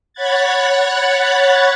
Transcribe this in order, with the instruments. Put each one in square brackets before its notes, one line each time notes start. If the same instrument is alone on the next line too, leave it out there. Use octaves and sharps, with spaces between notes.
[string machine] C#5 F#5 B5 F#6 G#6 A6